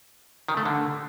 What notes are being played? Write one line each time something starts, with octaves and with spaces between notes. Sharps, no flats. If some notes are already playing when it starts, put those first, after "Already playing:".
D#3
A3
D3